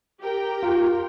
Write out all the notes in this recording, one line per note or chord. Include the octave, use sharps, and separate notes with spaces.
G4 A#4 G5
F4